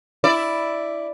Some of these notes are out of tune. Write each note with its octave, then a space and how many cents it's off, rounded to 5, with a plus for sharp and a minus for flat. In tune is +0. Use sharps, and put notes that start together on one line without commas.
E4 +0 D5 +0